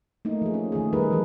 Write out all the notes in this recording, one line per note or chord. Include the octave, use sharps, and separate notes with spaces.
A3 A#3 D#4
F3 G#4
C#4
D#3 A3 G#4
G3 D#4 G#4 A#4 B4
E3 F#3 G3 G#4 A4